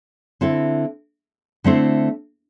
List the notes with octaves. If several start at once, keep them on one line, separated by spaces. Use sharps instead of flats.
D3 C4 E4 A4
D3 A3 C4 E4 C5